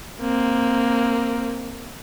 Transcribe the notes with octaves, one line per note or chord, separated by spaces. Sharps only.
A#3 C4